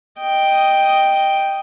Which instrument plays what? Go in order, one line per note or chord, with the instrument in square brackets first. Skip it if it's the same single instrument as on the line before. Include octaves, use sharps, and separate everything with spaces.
[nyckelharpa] D#5 G5